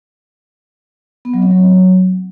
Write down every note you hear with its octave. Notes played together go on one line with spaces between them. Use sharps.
B3
F#3
C4
F#3